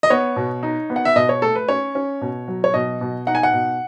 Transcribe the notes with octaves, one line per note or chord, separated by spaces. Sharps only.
D#5
B3 C#5
B2
D#4
B3
F#5
E5
B2 D#5
C#5
A3 A4
B4
C#4 C#5
C#4
B2
F#3
C#5
B2 D#5
B2
D#4 F#5
G#5
F#5
B2